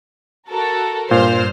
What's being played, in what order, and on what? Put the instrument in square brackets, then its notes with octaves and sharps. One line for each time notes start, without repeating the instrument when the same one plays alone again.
[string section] F#4 A4 A#4
[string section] G2 C5 F6 [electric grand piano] A#2